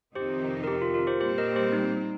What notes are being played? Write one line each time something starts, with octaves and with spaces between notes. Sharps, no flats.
F2 C3 D#3 C4 D#4 G4 C5
A#4
G4
F4
F4 A#4
G4 C5
A#2 G3 C4 G4 C5
A#4 D#5
G4 C5
D#4